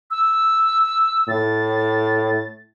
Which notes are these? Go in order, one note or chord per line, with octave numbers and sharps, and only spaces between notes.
E6
A2 A6